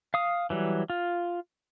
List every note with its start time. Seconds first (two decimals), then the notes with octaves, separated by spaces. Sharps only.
0.14 F5 D#6
0.50 E3 F#3 G3
0.90 F4